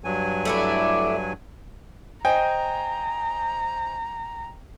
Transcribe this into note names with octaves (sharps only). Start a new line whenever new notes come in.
G2 F#3 G#5
A3 D4 E4
C5 D#5 G5 G#5 A#5